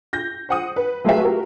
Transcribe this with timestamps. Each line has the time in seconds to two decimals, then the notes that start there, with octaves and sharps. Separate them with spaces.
0.13 G6 A#6
0.49 C5 F#5 D#6
0.76 B4
1.04 F#3 A3 F4 G#4 B4 E5
1.20 F#4 G4 A#4